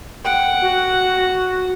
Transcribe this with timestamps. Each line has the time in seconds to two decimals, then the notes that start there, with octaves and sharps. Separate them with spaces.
0.25 F#5 G5
0.62 F#4